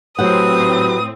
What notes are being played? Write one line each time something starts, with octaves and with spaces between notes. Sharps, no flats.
A2 F#3 C4 G4 B4 F#5 D#6